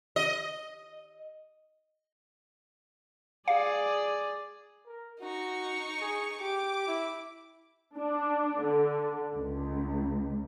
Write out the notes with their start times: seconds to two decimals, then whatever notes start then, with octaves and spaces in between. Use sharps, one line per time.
0.16 D#5
3.48 G#4 D5 F5
4.86 A#4
5.21 D#4 F#4 C#6
6.00 G#4
6.40 G4 D6
6.87 E4
7.96 D4
8.62 D3
9.36 C#2